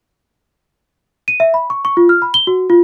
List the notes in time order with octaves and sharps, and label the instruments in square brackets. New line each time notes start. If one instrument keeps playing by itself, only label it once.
[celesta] D#7
E5
B5
C#6
C#6
F4
F6
B5
G7
F#4
F4